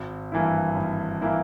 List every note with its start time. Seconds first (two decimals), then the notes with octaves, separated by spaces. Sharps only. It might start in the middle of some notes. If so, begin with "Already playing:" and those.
Already playing: G#1
0.32 G2 E3 A#3 E4
0.77 G#1
1.21 E3 A#3 E4